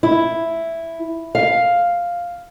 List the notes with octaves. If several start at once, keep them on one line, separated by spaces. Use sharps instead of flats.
E4
F5